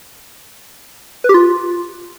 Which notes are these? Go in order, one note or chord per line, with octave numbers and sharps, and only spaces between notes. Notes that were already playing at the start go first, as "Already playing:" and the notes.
B4
G4
F4